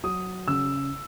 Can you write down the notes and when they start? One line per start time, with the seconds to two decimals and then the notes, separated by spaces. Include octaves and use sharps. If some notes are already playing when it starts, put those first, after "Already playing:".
0.04 F#3 D#6
0.47 C#3 E6